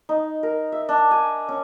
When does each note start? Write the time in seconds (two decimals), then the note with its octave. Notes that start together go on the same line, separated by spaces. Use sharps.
0.09 D#4
0.43 A#4
0.72 E5
0.89 D4
1.11 G#5
1.49 C#4